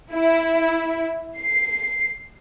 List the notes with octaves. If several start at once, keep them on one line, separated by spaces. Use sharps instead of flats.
E4
C7